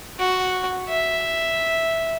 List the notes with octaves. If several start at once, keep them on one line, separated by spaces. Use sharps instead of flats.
F#4
E5